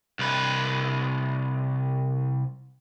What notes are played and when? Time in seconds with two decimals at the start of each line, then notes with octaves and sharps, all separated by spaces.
0.19 C2 B4